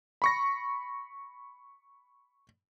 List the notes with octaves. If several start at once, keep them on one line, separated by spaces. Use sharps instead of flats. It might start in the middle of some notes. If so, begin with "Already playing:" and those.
B5 C#6 A#6